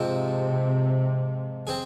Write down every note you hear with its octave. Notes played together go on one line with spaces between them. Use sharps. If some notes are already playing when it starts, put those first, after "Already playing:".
Already playing: G#2 C3 F3 C4
C4 G#4